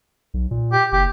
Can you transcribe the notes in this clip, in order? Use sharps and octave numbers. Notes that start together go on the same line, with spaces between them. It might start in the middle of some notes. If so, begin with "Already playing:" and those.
B1
A#2
G4
F#1 G4